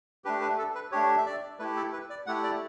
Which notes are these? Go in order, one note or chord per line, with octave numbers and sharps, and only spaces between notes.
A3 D4 G4 B4
B4
A4
B4
A3 D4 G4 C#5
E5
D5
A3 E4 G4 B4
A4
B4
D5
A3 E4 G4 F#5
D5